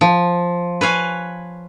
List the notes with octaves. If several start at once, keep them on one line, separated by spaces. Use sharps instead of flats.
F3
B4 C#5 F5 G#5